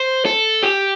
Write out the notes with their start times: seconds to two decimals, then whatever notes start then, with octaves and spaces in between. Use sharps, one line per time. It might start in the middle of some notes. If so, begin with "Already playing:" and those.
Already playing: C5
0.26 A4
0.63 G4